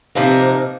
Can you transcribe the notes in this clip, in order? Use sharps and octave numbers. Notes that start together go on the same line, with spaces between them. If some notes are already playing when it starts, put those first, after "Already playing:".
C3 F3 A#3 D#4 A#4 F5
C5